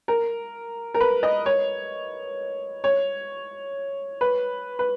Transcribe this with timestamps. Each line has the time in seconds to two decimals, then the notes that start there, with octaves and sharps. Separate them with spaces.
0.08 A#4
0.94 A#4
1.00 B4
1.23 D#5
1.46 C#5
2.84 C#5
4.21 B4
4.79 B4